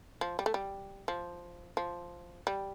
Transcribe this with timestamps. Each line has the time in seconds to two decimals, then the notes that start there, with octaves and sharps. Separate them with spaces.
0.21 F3
0.39 G3
0.46 A3
0.54 G3
1.08 F3
1.77 F3
2.47 G3